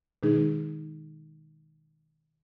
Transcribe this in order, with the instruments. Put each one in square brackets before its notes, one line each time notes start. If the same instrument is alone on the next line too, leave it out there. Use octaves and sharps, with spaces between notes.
[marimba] B2 D#3 G#3 D#4 G#4